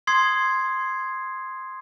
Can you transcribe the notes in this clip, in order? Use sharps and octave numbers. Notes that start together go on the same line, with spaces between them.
C6 D#6 G#6 C7